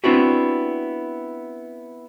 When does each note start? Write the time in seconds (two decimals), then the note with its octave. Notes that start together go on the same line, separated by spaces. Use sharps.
0.04 B3 C4 D4 E4 F#4 G4